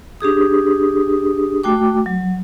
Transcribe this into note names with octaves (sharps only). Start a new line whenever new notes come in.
D4 G4 G#4 D#6
A3 F#4 G5 D6
F#3